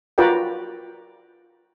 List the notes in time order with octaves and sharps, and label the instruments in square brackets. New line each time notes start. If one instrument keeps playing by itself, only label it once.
[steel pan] F4 F#4 A#4 B4 D5 G5